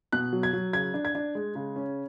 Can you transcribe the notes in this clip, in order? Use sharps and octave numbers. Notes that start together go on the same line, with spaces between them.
B2 F#6
F#3
G#6
F#3
C#3 G#6
D4
G#6
D4
G#3
C#3
C#4